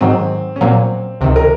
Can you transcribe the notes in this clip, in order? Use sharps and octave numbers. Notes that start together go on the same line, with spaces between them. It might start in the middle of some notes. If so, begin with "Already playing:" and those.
G#2 D#3 F#3 C4
C#4
A#2 F#3 A#3 C4
C#2 C3 D#3
A#4